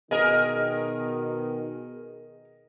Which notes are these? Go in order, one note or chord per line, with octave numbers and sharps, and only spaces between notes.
B2 D#3 G#4 A#4 D#5